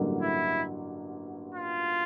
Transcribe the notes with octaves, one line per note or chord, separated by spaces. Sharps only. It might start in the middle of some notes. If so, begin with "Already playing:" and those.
Already playing: A1 G2 D3 F#3 A#3
E4
F4